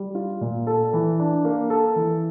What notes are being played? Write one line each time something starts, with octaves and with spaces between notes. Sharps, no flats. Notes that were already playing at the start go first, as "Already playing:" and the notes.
Already playing: G3
F4
A#2
A4
E3
D4
A#3
A4
E3